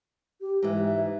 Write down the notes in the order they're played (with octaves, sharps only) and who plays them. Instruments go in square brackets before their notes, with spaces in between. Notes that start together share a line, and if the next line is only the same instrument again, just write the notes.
[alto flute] G4
[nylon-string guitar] G#2 E3
[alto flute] E5